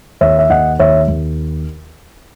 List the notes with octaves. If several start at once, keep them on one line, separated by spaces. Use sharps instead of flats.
D#2 C#5 E5
E5
D#2 D#5 F#5
D#2 C#5 E5
D#2